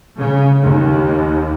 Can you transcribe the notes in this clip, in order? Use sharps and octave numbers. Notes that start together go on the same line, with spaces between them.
C#3
D#2